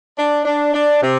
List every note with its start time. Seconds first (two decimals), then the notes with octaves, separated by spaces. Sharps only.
0.17 D4
0.45 D4
0.73 D4
1.01 C3